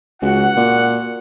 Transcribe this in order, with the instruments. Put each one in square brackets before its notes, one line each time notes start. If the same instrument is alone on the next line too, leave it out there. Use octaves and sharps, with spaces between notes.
[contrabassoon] C#2 [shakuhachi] F#4 [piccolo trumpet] F#5
[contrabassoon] A#2